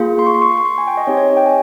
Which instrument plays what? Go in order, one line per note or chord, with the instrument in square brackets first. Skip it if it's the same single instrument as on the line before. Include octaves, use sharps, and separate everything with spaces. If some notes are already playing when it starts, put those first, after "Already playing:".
Already playing: [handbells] A#3 F4 G#4
C6
C#6
C6
C#6
C6
C#6
C6
G#5
G5
D#5
C4 D#4 G4 C#5
C#5
D#5
G5
G#5